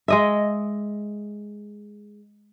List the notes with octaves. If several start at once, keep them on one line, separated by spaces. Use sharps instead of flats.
G#3 D#5 E5